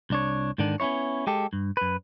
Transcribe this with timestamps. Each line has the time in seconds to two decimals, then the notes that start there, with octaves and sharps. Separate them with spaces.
0.10 C2 D4 C#5
0.58 G#2 D3 D#3 D4
0.80 B3 C#4 D4 E4 C#5
1.27 G#3 G4 A4
1.53 G2
1.77 F#2 B4